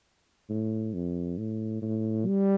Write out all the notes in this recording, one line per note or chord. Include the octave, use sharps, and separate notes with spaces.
A2
F2
A2
A2
G3